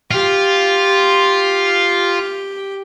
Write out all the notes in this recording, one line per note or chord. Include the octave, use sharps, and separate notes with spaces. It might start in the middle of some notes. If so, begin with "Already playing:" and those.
F4 G4